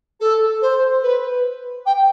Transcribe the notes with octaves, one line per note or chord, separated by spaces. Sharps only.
A4
C5
B4
G5